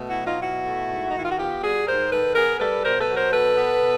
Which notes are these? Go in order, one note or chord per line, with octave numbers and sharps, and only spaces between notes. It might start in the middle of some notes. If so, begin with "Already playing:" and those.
Already playing: B2 A3
E4 F#4
F#3
D#4 F4
B2 E4 F#4
A3
G#2
D#4
D#3 E4
F4
F#4
B3 F4 G4
G3 F#4 G#4
G#2 A#4 C5
D#3 A4 B4
B3 G#4 A#4
G3 A4 B4
B2 A#4 C5
A4 B4
F#3
A#4 C5
B2 A4 B4
B3
B2